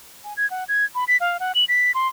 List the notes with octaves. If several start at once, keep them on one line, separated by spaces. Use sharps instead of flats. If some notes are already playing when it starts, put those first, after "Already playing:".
G#5
G#6
F#5
G#6
B5
B6
F5
F#5
F#7
B6
C6